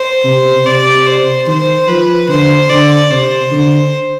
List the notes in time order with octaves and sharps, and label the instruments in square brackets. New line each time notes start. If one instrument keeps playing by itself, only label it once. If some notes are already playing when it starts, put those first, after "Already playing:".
Already playing: [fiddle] C5
[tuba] C3
[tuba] C3 [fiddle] D5
[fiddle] C5
[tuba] D#3 [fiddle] C5
[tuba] F3 [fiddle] B4
[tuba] D3 [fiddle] C5
[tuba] D3 [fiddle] D5
[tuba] C3 [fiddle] C5
[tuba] D3